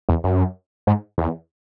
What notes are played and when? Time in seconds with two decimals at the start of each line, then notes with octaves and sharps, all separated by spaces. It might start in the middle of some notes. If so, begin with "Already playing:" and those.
0.09 E2
0.24 F#2
0.87 G#2
1.18 E2